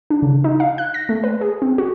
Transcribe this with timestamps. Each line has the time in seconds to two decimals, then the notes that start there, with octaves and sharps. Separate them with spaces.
0.10 D4
0.22 C#3
0.44 D#4
0.60 F5
0.78 F#6
0.94 A#6
1.09 A3
1.24 B4
1.41 G#4
1.62 C4
1.78 F#4